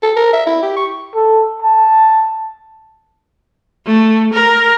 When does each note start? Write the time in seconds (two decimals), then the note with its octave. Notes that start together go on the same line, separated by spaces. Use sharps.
0.03 A4
0.16 A#4
0.33 E5
0.47 E4
0.62 G4
0.76 C#6
1.15 A4
1.62 A5
3.86 A3
4.33 A#4